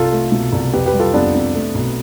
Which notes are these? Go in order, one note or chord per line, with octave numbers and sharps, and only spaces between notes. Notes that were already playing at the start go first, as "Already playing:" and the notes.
Already playing: C2 F4 A4
A3
B2
C2
F2 G4 B4
G4 B4
G3
F4 A4
F2 B3 D4
C3
A3
B1